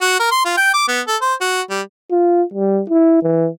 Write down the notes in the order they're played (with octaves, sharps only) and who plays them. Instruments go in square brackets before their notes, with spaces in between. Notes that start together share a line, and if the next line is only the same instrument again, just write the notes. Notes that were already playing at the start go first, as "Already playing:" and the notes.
[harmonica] F#4
A#4
C6
F4
G5
D6
B3
A4
C5
F#4
G3
[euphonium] F4
G3
E4
E3